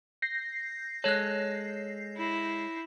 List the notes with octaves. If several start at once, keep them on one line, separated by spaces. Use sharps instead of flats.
G6 A#6 C7
G#3 A4 C#5 F#6
E4